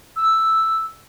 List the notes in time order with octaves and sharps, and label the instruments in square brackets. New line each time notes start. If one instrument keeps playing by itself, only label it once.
[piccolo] E6